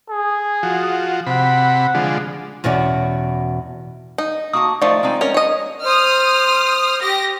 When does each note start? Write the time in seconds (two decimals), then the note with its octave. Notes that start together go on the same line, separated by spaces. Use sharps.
0.10 G#4
0.63 F3 F#4
1.27 C3 F#5 B5
1.95 D3 F3 G#3
2.64 E2 B2 C#4 F#4 D5
4.18 D#4
4.53 A#3 F#4 A5 D#6
4.82 D#3 F3 A3 D5
5.03 G#3 C4 D#4
5.21 C#4 A#4
5.34 C#5 D#5
5.83 C5 D#6 F6
7.02 G4 A#6